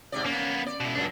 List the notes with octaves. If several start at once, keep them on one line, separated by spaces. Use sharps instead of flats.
G#2 C3 D5
A#3 B3 C#4
D5
B2 E4
F#2 A#2 C#3 D4